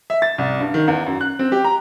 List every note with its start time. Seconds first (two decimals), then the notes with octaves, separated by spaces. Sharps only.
0.10 E5
0.22 A6
0.38 C2
0.60 G2
0.74 D#3
0.88 E2
1.06 F#2
1.21 F#6
1.39 C4
1.52 G4
1.64 A#5